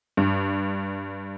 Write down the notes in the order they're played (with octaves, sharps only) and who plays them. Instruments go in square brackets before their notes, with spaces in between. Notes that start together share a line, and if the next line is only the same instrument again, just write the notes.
[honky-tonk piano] G2